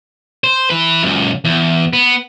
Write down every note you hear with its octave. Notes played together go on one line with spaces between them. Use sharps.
C5
E4 B4
C#2 F#2
E2
B3